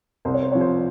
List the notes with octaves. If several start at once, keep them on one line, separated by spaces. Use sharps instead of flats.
C2 C5
C#5
C5
C3 F3 C#5
C5